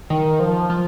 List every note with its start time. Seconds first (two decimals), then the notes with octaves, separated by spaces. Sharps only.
0.10 D#3
0.40 F3
0.69 F3